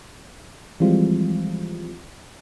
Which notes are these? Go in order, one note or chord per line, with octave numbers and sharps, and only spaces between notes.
E3 F3 G3 G#3 C4 F4